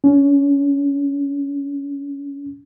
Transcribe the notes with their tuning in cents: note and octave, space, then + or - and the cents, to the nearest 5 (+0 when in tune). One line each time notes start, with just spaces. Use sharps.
C#4 +25